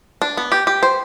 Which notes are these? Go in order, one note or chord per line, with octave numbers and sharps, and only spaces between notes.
D4
B3
G4
G4
C5